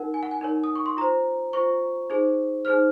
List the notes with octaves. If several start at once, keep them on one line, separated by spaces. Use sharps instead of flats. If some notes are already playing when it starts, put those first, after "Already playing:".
Already playing: D#4 A#4 F#5
G#5
F#5
G#5
D#4 A#4 C#5
D#6
C#6
C6
F4 C5 A#5
F4 C5 C#6
D#4 G#4 C5
D#4 G#4 C5 F6